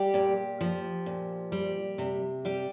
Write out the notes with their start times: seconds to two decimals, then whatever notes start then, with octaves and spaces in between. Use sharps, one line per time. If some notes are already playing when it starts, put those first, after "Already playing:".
Already playing: G3 G4
0.14 A#2
0.61 F3
1.06 A#2
1.52 G3
1.98 C3
2.45 G3 G4